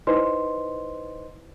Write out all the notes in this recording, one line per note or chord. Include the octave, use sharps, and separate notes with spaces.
D#4 E4 B4 C5 D#5 C6